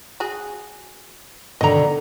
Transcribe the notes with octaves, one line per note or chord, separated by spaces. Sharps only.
F#4 G#4
B2 D3 D#3 D#5 A#5